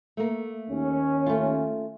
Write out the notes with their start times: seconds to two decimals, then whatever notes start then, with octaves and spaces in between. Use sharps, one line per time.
0.17 A3 A#3
0.70 D#2 C#4
1.26 A3 F4